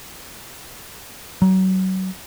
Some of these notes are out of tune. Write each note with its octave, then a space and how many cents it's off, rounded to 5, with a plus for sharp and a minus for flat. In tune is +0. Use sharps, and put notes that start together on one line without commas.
F#3 +30